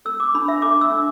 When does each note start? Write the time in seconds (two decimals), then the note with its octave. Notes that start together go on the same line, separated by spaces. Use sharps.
0.05 A4 E6
0.20 D6
0.35 D4 B5
0.48 E5
0.62 A4 D6
0.81 E6
0.91 D4